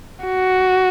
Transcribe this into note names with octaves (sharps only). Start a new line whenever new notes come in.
F#4